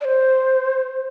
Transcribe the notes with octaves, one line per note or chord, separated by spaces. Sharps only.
D5
C5